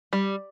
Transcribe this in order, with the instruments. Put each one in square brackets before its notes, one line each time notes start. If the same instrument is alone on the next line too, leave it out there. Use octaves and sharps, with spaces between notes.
[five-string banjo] G3